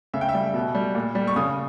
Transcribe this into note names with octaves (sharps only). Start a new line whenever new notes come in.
C#3 E5
G5
E5
G3
B2
G3
A#2
G3
C#6
C#3 D#6